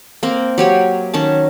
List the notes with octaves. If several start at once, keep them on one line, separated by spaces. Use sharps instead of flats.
A#3 C4
F#3 G4 C#5
D#3 C#4 A5